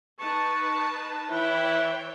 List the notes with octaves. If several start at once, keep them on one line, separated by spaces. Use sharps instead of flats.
D#4 B4 A5 C#6
E3 E4 B4 C#5 G5